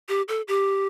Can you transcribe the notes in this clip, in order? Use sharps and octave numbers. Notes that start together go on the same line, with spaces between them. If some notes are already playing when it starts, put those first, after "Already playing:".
G4
A4
G4